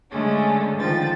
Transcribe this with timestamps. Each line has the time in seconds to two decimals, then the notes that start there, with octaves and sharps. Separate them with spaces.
0.11 D3 G#3 A3 C#4 D4
0.77 D3 D#3 F3 G5 A6